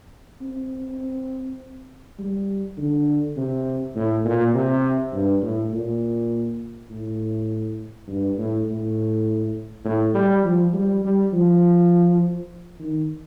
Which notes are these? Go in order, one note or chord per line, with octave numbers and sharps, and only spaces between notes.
C4
G3
D3
C3
A2
A#2
C3
G2
A2
A#2
A2
G2
A2
A2
A2
G3
F3
G3
G3
F3
D#3